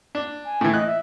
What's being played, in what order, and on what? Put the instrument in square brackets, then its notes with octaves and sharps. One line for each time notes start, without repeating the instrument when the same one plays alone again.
[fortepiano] D4
[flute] G#5
[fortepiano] A2 E3
[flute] D#5 [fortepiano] F#6
[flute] E5